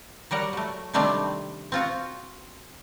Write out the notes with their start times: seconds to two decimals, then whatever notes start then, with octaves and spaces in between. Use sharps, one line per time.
0.31 F#3 G3 A#4 F#5
0.53 F#3 A3
0.93 C3 D#3 G3 A3 C4 D4
1.72 C4 F4 F#4